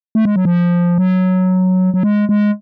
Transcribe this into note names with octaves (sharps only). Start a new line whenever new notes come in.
A3
G#3
F#3
F3
F#3
F#3
G#3
G#3